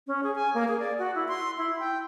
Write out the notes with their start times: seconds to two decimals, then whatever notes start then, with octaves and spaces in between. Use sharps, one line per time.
0.07 C#4
0.23 G#4
0.35 G#5
0.54 A#3
0.68 G#4
0.79 D5
0.99 F#4
1.15 E4
1.28 C6
1.58 E4
1.79 G5